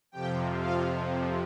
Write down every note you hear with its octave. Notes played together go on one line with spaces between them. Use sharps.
F2 C3 F3 G4 G5
F4 F5